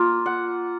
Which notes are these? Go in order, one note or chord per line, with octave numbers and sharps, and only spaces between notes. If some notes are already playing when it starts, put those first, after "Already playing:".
Already playing: A#3 F4
F#5